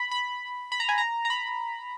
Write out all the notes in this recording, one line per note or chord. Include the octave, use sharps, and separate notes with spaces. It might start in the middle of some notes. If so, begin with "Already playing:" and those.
Already playing: B5
B5
B5
A#5
G#5
A#5
A#5
B5